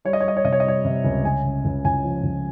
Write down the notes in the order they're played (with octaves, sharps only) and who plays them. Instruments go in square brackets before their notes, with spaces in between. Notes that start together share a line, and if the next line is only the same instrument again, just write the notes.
[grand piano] G3 C#5
D#5
C#5
G3 D#5
C#5
C3 D#5
C#5
D#5
G3 C#5
C3
C#2
C#2 G#5
C#3
C#2
C#2 G#5
F3
C#2